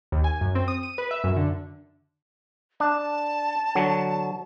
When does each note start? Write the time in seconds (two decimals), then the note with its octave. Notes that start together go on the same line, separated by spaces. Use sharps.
0.12 D#2
0.24 G#5
0.41 F#2
0.55 C4
0.68 D#6
0.83 D#7
0.98 B4
1.11 E5
1.24 F#2
1.37 D3
2.80 D4 A5
3.75 D3 F#3